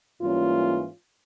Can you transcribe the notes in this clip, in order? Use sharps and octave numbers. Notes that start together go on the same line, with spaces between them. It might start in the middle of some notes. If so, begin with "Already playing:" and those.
G#2 E3 G3 A#3 C#4 F4